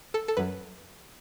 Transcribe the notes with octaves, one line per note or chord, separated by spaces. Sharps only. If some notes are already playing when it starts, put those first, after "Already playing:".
A4
A4
F#2 F#3 B4